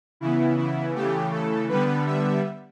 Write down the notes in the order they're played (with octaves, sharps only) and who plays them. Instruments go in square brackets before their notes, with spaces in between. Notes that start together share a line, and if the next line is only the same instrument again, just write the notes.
[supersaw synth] C#3 E3 B3 E4
E4
C#3 E3 A3 G4
A4
D3 G3 B3 B4
E5